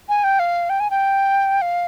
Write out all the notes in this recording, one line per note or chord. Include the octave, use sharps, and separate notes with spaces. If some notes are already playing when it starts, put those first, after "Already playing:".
G#5
G5
F5
G5
G#5
G5
F5